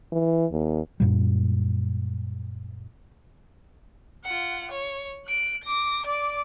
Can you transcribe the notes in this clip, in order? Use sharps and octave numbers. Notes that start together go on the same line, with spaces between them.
E3
D#2
F#2 A#2 G3
F4 F#5
C#5
F#6 D7
D6 A#6
D5 D6